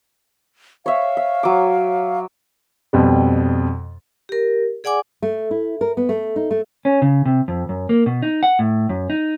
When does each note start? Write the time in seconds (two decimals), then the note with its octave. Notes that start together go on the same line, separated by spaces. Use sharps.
0.86 C#5 E5 F5
1.17 E5
1.43 F#3 D6
2.93 F2 B2 G3
4.29 G4 A#4
4.84 G#4 D5 F#5 G#5 D6
5.22 A3
5.51 E4
5.81 A#4
5.97 B3
6.09 A3
6.36 D#4
6.51 A3
6.85 C#4
7.02 C#3
7.25 C3
7.48 F2
7.69 F#2
7.89 A#3
8.06 B2
8.22 D#4
8.43 F#5
8.59 A2
8.89 F#2
9.10 D#4